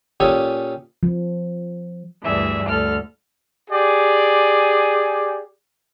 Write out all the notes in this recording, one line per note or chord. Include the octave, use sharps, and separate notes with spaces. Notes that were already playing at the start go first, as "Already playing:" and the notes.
A#2 C#4 G4 A4 G#5 D#6
F3
D2 G2 E3 G#4 E5
D2 A4 F6
G4 G#4 D5